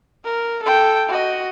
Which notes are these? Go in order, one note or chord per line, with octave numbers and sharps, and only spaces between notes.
A#4
A4 G5
F#4 D#5